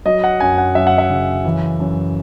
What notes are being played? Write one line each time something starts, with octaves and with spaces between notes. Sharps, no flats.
F#3 D#5
F#5
F#2 G#5
F#5
F#2 E5
F#5
E5
C#3
E3
F#2